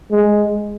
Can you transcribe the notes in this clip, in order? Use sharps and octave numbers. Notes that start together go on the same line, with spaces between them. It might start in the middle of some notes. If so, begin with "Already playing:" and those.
G#3